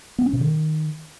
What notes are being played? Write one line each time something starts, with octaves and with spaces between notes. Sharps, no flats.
B3
C#4
B2
D#3